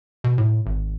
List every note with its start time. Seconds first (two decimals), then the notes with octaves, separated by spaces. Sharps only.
0.24 B2
0.38 A2
0.66 G#1